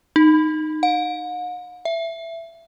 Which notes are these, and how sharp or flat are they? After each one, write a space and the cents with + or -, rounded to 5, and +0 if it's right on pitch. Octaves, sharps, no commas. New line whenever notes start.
D#4 -10
F#5 -45
E5 +15